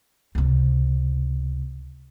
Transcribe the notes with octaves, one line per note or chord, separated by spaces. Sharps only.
C#2 C3